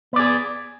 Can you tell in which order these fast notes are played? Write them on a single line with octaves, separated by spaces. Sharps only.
B3 D5 G#4